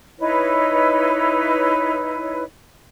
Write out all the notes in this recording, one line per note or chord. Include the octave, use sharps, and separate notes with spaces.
D#4 E4 B4 C#5